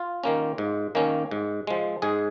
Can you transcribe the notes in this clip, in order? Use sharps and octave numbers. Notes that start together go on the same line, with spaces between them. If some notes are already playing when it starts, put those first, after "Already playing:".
Already playing: F4
D#3 A#3 C#4
G#2
D#3 A#3 C#4
G#2
F3 G#3
G#2 G#4